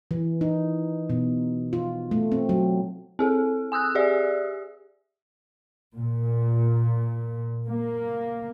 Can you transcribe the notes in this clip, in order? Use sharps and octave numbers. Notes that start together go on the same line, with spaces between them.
E3
D#4
B2
F4
A3
C4
F#3
C4 G#4 A4
G#5 D#6 E6 F#6
G4 G#4 D5 E5
A#2
A#3